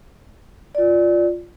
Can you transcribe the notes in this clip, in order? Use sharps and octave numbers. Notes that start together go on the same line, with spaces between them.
F4 D5